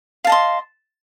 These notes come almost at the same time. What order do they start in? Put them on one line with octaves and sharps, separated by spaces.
F5 A5 D#5 C6